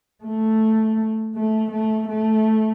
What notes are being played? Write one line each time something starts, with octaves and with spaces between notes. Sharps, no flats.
A3
A3
A3
A3